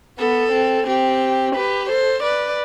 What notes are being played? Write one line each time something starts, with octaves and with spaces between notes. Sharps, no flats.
B3 A4
C4
C4 G4
G4 B4
A4 C5
B4 D5